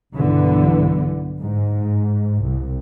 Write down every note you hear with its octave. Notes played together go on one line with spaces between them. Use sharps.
B1 G2 D3 E3 B3
G#2
C2